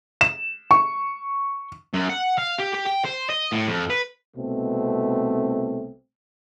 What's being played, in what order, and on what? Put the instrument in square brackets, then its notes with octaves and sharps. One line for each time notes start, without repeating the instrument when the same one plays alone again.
[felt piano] E7
C#6
[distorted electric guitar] F#2
F#5
F5
G4
G4
G5
C5
D#5
A2
F2
B4
[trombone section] C2 B2 A3 C4